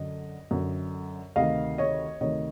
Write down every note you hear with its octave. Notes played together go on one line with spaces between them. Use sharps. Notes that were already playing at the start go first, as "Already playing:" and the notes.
Already playing: F#2 D3 D#5
F#2 D3
D2 C3 D#3 D#5 F5
C#5 D#5
D2 C3 D#3 C#5 D#5